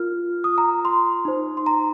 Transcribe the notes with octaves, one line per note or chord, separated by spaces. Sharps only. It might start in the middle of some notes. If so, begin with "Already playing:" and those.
Already playing: F4 A#4 F6
D#6
A#5
C6
D#4 C5
C6
A#5